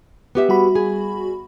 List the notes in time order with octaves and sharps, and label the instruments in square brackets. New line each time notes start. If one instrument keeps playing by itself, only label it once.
[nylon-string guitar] B3 G4 E5
[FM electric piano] G3 F#4 B5
[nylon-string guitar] G#4